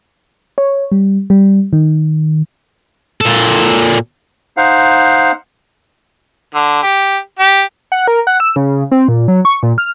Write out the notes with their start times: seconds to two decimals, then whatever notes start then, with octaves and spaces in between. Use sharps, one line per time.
0.58 C#5
0.92 G3
1.30 G3
1.73 D#3
3.21 A#2 A4
4.57 D#4 C5 F5 F#5
6.55 D3
6.83 G4
7.39 G4
7.92 F#5
8.07 A#4
8.27 F#5
8.40 E6
8.56 C#3
8.91 C4
9.08 A#2
9.28 F#3
9.45 C#6
9.63 A#2
9.78 F6